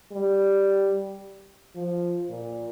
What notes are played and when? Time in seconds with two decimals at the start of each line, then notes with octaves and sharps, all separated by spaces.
0.12 G3
1.75 F3
2.30 A#2